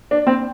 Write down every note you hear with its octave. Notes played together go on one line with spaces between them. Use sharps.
D4
C4